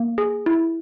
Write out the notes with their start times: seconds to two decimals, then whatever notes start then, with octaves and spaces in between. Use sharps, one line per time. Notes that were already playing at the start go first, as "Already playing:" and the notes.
Already playing: A#3
0.18 G#4
0.46 E4